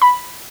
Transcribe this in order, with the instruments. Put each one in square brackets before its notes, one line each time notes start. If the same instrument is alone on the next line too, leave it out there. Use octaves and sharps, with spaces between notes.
[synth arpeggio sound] B5